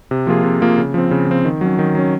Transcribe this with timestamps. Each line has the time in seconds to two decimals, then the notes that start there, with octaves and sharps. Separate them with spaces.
0.11 C3
0.27 F3 A#3 F4 G#4
0.44 C3
0.61 F3 A#3 F4 G#4
0.78 C#3
0.94 F3 C4
1.11 C#3
1.27 F3 C4
1.45 D#3
1.61 F#3 C#4
1.79 D#3
1.95 F#3 C#4